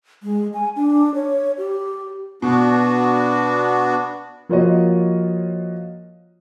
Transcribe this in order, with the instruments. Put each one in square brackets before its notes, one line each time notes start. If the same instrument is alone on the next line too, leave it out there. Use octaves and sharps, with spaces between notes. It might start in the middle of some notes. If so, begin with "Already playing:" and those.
[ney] G#3
G#5
D4
C#5
G4
[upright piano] B2 [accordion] B3 D4 F#4
[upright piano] F3 A#3 F4 F#4 C#5 D#5